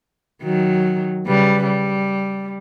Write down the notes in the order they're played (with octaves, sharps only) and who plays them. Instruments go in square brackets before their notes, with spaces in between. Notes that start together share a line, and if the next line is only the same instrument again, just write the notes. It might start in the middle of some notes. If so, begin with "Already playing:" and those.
[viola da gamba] D#3 F#3
C#3 G3 B4
G3